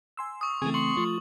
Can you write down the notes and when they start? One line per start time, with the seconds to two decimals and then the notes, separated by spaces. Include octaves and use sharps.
0.17 G#5 C6 E6
0.41 C#6 D#6
0.62 C#3 E3 A3 C4 G#4
0.74 C6 C#6 F#7
0.97 F3 A3 F4